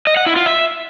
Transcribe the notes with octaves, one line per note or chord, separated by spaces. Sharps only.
D#5
F#5
E4
F4
E5